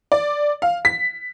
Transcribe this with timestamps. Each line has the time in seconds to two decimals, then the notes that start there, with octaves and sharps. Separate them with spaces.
0.12 D5
0.62 F5
0.85 B6